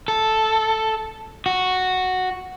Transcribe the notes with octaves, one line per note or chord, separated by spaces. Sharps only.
A4
F#4